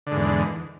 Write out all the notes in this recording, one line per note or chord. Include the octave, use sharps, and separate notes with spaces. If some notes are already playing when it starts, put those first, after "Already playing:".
E2 G#2 D3